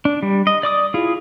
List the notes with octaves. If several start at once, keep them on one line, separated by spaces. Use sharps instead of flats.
D4
G3
D#5
D5 D6 D#6
E4 F4 G#4